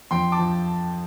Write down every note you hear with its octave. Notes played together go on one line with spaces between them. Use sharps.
F2 G5 C6
A5 D6
F3